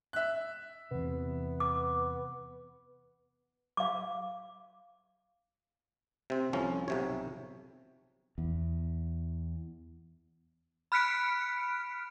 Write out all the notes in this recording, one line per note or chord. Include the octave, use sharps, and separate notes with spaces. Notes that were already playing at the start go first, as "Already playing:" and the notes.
E5 F#6
E2 C3 B3
D6
F5 D6
C3 C4
C2 F2 F3 C#4
B1 C3 C#5
E2
B5 F6 F#6 B6 C#7 D7